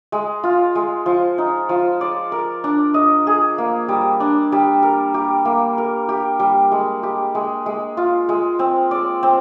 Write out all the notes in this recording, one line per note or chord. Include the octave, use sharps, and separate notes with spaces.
G#3
F4
G#3
F3
D#4
F3
D5
A#4
D4
D#5
G#4
A#3
G3
D4
G3
A#4
G4
A#3
A#4
G4
G3
G#3
G4
G#3
G#3
F4
G#3
C4
D5
C4